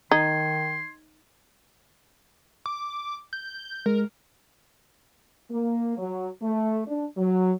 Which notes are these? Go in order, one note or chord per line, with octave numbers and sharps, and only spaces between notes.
D#3 D#4 C6 G#6
D6
G6
G#3 A#4
A#3
F#3
A3
D4
F#3